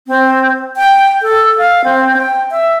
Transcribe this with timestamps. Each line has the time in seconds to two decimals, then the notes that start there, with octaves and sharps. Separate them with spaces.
0.07 C4
0.77 G5
1.22 A4
1.58 F5
1.84 C4
2.17 G5
2.51 E5